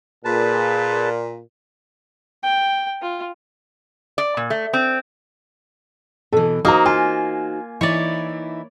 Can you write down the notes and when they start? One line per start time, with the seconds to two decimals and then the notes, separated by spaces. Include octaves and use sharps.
0.25 A#2 G#4 B4 A5
2.43 G5
3.02 F4
4.18 D5
4.37 A#2
4.50 A3
4.73 C4
6.33 B2 E3 A4
6.65 A#3 D#4 F#4 C5 A#5 D#6
6.86 F4 G#5
7.81 E3 D#4 E4 C#5 D5